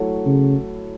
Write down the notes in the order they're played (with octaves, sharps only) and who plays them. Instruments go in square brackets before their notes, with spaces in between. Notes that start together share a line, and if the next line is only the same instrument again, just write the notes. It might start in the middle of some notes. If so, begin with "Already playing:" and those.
Already playing: [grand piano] F#3 A3 E4 A4 C#5
[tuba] C#3